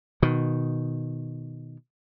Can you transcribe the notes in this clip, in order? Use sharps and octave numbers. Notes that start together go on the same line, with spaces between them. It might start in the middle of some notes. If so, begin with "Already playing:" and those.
B2 D#3